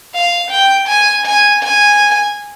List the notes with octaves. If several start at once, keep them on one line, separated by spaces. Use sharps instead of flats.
F5
G5
G#5
G#5
G#5